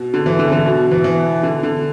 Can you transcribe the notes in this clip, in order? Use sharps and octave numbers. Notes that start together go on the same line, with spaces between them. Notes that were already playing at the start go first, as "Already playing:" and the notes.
Already playing: B2
D3
E3
D3
E3
D3
B2
E3
E3
D3
D3